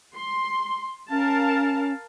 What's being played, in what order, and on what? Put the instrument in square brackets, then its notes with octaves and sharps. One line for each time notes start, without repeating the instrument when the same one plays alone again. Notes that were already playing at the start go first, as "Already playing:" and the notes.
[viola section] C6
[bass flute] C#4 [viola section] A#4 F5 A5